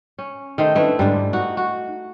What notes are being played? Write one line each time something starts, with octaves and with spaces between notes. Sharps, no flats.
C#4
D#3 A3 C5
A3 C#4 D4 E4 B4
G#2 D3 G3 D4
D#4 F#4
F#4